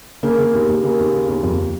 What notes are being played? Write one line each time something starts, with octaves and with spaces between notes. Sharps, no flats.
C#3 A#3
C#3
D#2
D#2
C#3 A#3
D#2
C#3
D#2
F2